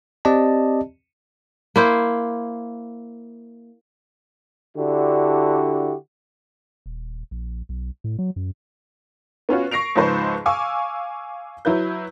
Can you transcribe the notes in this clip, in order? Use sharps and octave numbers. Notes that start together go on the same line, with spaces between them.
C4 G4 D5 D#5 A5
A#3 E4 C5
D3 D4 E4 F#4 G4
D#1
A#1
B1
A2
F#3
F#2
B3 C#4 F4 F#4
C#6 A#6 C7 D7 F7
C#2 G#2 F3 B4 C5 C#6
F5 G#5 C#6 D6 E6
F#3 E4 B4 G6